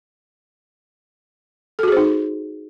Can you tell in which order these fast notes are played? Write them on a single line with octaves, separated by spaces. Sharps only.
A4 F#4 G#4 C5 D#4